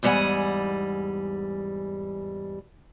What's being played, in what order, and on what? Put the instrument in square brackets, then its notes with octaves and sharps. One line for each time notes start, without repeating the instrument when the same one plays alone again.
[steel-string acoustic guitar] E2 G#2 G3 F#5 G#5